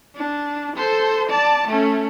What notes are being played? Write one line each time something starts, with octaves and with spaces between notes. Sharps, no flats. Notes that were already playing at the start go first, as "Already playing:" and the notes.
D4
A4 C5
D5 A5
A3 C#4